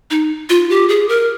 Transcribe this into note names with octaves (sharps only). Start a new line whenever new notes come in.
D#4
F4
G4
G#4
A#4